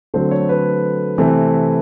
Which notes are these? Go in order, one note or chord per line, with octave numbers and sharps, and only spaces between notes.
D3 F#3 A3 C4 C5
C#5
B4
C3 E3 A3 C4